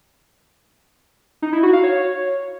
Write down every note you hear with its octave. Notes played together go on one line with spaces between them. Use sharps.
D#4
E4
F#4
F5
C#5